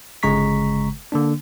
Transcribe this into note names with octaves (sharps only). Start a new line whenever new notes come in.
G1 C#3 G#3 A#5 C#6 B6
D3 A#3 D4